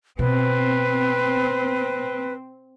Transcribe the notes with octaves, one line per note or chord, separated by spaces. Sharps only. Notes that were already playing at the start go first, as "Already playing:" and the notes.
B2 C4 B4